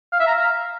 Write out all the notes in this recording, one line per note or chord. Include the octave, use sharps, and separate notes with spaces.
F5
E5
A#5
F5